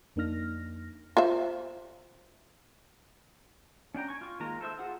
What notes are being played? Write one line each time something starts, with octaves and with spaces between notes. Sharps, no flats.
F2 A#3 D4 D#4 F6 A#6
F4 C5 E5
C#4 D4 G5 A#5
G#5 C#6
F4 C#6
D#3 G#3 A#3 F4 A#5
A4 C5 E5 E6
F4 G#4 F#5